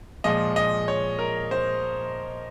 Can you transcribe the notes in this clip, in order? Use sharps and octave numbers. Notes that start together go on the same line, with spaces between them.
A#2 F3 G#3 D#5
D#5
C#5
A#4
C5